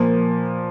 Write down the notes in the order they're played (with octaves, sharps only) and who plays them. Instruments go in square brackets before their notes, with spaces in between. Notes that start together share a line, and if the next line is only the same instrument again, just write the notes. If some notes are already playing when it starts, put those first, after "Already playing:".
Already playing: [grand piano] A#2 F3 A#3